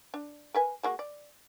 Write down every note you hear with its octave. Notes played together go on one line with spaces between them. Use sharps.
D4
A#4 B4 G#5
G#3 A#3 F#4
D5